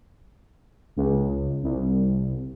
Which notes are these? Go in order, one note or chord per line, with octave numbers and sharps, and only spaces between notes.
C#2
C2